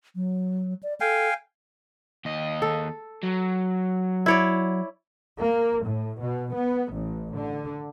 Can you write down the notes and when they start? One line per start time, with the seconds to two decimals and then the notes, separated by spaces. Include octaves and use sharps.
0.15 F#3
0.83 D5
1.01 A4 F5 G5 G#5
2.25 D#2 D#5
2.62 A4
3.23 F#3
4.26 E4 C#5 D5
5.39 A#3
5.84 A2
6.20 B2
6.53 B3
6.91 A1
7.35 D3